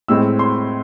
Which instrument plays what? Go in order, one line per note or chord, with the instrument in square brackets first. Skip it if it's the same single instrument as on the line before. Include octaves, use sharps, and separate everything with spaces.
[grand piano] A2 G#3 C4 E6
C6